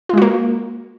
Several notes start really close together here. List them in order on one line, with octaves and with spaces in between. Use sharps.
F4 G#3 F#4 A#3